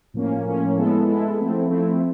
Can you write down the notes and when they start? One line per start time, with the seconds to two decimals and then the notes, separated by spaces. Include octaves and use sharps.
0.14 A2 F3 A#3 C#4
0.45 A2 F3 A#3 C#4
0.76 G#3 B3 E4 A4
1.07 G#3 B3 E4 A4
1.38 F3 A3 C4 E4
1.69 F3 A3 C4 E4